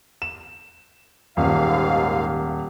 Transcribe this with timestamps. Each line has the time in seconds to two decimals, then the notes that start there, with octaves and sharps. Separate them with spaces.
0.22 E7
1.37 D#1 D#2 G#2 F5